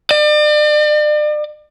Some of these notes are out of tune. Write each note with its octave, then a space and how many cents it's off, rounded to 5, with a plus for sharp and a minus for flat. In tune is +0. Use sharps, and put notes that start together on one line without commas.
D5 +40